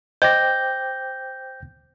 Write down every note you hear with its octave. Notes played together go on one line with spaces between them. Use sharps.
C5 D#5 G5 D6 G6 A#6